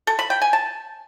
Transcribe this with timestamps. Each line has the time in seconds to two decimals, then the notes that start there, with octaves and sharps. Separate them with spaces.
0.07 A4
0.19 B5
0.30 G5
0.42 G#5
0.53 A5